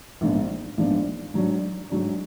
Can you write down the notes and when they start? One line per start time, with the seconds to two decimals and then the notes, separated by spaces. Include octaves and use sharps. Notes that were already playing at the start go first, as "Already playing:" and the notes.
0.21 A#1 G#2 F3 B3 D4
0.77 A#1 G#2 F3 B3 D4
1.34 G#2 F#3 D4
1.90 G#2 F#3 D4